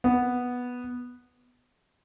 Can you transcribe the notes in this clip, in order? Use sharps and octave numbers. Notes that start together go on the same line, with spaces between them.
B3